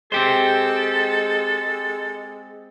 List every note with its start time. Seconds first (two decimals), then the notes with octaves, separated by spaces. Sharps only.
0.12 G#3 C4 G4 A4 C5